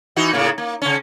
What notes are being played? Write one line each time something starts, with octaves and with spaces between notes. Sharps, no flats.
E3 D#4 F#4
A2 C#3 A#3
A#3
C#3 C#4